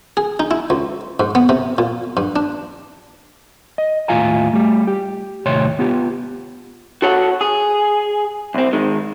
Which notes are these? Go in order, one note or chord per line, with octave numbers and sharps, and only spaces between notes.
G#4
D#4
E4
C#2
G#2
B3
C3
A#2
G2
D4
D#5
D#2 A2 F4 F5 G#5 A#5
G3 A3
G4
D#2 A2 C3 C#5 C6
B3 F4 G4
F#4 A4 C#5 F#5
G#4
C2 C4
G#2 D#3 G#3